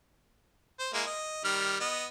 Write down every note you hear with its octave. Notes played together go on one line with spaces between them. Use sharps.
C5
G#3 A#3 E4
D#5
D#3 G3 F6
B3 D#5